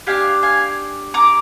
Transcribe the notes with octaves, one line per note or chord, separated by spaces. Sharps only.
D4 G4 F5 G#5
F5 G#5
A#5 D6